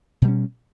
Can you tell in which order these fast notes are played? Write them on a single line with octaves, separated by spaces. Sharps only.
B2 G3 C#4